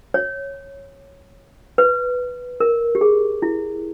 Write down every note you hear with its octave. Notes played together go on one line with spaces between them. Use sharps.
C#5
B4
A#4
G4
G#4
E4